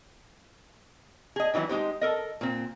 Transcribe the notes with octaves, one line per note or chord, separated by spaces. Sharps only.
G#4 D#5
D#3 E3 F#3 D#4 E4
G#3 D#4 G4 C5
A4 A#4 D#5
A#2 C4